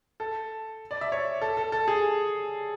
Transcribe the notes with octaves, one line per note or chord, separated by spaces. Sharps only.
A4
D5
E5
C#5
A4
A4
A4
G#4